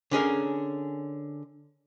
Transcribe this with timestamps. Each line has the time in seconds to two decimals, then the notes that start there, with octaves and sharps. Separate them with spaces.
0.11 D3 C#4 G#4 A#4